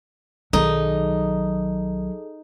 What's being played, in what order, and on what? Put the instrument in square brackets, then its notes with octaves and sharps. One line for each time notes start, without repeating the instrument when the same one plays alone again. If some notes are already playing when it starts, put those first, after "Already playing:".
[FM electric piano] B1 D#3 [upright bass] F#3 [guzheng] D#4 [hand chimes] G#4 A4